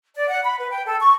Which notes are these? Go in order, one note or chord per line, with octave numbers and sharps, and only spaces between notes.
D5
F#5
B5
B4
G5
A4
C#6